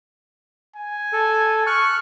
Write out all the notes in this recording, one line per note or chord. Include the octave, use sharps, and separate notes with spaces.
G#5
A4
C#6 F6 F#6